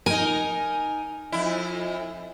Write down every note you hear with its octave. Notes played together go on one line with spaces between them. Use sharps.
D#4 A#4 G#5
F2 E4